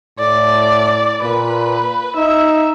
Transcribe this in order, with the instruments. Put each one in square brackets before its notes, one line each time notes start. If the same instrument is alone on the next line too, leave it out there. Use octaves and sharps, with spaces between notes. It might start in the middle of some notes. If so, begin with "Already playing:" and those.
[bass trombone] A2 [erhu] D5
[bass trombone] A#2 [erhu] B4
[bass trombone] D#4 [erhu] E5